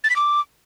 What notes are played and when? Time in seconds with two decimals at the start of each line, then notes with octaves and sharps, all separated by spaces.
0.04 A6
0.10 B6
0.16 D6